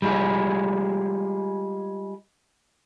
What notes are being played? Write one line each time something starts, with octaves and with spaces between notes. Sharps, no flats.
G3 G#3 F4 G#4